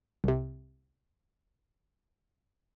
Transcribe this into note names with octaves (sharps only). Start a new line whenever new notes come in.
C2 C3